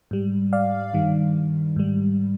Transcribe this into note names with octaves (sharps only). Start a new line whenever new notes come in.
G#2 G3
D5 F5
G2 D#3 G3
G#2 G3